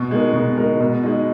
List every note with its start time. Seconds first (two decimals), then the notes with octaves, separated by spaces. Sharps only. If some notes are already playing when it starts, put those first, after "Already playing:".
Already playing: B2
0.11 G#3 D#4 A#4
0.33 B2
0.57 G#3 D#4 A#4
0.80 B2
1.03 G#3 D#4